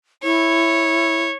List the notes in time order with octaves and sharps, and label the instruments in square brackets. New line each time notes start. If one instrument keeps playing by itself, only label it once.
[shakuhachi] E4 [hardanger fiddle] C#5